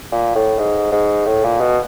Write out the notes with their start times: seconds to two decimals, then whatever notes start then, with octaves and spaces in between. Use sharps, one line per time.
0.12 A#2
0.35 A2
0.59 G#2
0.92 G#2
1.26 A2
1.44 A#2
1.60 B2